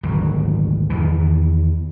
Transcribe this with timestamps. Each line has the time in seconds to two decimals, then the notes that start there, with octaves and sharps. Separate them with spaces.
0.03 D#1 G#1 D2 F#3
0.90 E2 D#3 E3